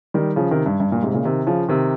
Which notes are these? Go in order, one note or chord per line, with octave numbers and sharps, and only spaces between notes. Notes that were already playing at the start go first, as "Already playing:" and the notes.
D#3 G3
C#3 F3
C3 D#3
G2
G2
G2 A#2
G#2 C3
A#2 C#3
C3 D#3
C#3 F3
C3 D#3